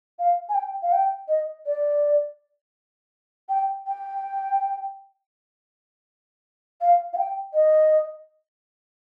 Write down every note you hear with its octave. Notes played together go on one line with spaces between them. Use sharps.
F5
G#5
G5
F5
G5
D#5
D5
G5
G5
F5
F5
G5
D#5